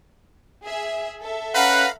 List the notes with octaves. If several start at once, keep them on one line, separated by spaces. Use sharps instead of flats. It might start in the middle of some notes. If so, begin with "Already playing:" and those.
G#4 E5
A4 E5
C#4 B4 F5 F#5 A#5 B5